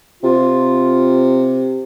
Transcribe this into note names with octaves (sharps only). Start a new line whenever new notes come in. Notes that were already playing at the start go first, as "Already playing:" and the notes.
C3 F4